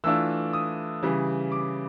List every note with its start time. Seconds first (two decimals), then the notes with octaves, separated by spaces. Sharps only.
0.04 E3 A3 D4 F4 E6
0.53 D#6
1.02 C#3 E3 G3
1.52 D6